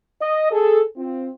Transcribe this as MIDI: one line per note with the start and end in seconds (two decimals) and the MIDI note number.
0.21 0.48 75
0.51 0.80 68
0.51 0.80 69
0.97 1.28 60
0.97 1.28 65